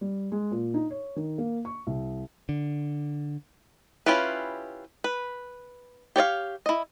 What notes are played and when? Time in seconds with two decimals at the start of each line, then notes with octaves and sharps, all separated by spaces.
0.01 G3
0.32 G#3
0.51 A#2
0.74 D#4
0.90 C#5
1.16 D#3
1.38 A#3
1.65 C#6
1.87 C2
2.49 D3
4.06 C#4 E4 F4 G4 B4
5.04 B4
6.16 G4 C#5 D5 F5
6.66 E4 D#5